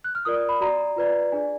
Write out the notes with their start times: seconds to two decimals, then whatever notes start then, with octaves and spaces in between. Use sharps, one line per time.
0.04 F#6
0.15 F6
0.25 F4 A#4 D5 D#6
0.38 D#6
0.49 B5
0.61 F#4 D5 A#5
0.96 F4 B4 D5
1.32 D4 G#4 D5 G#5